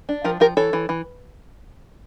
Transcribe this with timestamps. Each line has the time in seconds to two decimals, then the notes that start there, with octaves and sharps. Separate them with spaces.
0.09 D4
0.24 F3 G4 A#4
0.40 F3 G4 A#4
0.57 E3 A4 C#5
0.73 E3
0.89 E3